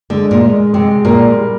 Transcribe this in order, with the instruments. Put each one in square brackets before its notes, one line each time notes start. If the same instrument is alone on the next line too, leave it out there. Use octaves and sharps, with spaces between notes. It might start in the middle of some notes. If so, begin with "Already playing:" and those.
[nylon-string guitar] D3 [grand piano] G#3
[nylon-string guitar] A#2
[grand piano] G#3
[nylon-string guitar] C3 [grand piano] G#3
[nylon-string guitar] A#2 [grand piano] A#4
[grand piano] G3